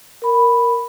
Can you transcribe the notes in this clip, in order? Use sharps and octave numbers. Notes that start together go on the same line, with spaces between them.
A#4 B5